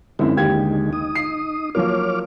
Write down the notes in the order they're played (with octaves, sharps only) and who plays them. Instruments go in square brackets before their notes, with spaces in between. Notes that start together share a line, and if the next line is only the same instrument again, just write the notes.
[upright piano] F#2 C4 E4 [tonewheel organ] D3 G#3 D#4
[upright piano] D#2 G4 G#6
[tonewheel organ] D#4 D#6
[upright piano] C7
[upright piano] F3 F#3 A#3 [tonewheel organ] C#5 D6 F6